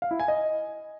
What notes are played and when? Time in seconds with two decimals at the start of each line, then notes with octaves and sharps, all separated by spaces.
0.02 F5
0.11 E4
0.20 G#5
0.28 D#5